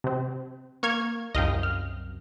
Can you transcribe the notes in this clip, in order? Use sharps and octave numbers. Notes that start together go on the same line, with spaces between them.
C3 C4
A#3 C#6 F6 G#6
C2 F#2 D#5 F5 G5
F6